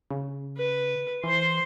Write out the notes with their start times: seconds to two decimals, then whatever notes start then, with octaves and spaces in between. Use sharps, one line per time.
0.11 C#3
0.57 B4
1.24 E3 C5 C6